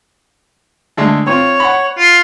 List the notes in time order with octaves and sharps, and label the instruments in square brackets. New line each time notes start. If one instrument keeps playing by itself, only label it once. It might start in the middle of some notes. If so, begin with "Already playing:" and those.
[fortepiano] D3 G#3 A3
[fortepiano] C4 F4 [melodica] C#5
[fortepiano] F#5 B5
[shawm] F4